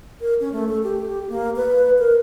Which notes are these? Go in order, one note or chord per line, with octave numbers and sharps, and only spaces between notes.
A#4
C#4
A3
A4
G4
A#3
B4
A#4